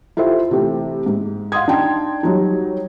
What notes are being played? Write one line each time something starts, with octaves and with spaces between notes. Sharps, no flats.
E4 F4 G4 A4 C5 E5
C3 E3 A3 C4
G#2
F5 F#5 C6 D#6 G#6
D4 D#4 G5 C6
F#3 G3 D#4